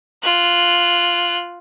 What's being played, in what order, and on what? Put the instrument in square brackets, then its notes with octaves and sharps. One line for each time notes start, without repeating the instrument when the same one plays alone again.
[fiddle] F4 F#6